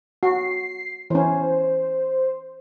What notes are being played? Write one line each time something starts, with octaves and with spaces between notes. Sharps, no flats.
F#4 C7
E3 C#4 C5